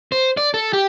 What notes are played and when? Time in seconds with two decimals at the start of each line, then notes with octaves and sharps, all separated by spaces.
0.12 C5
0.37 D5
0.54 A4
0.73 G4